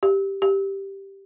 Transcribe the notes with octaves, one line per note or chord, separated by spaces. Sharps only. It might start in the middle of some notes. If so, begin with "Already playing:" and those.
G4
G4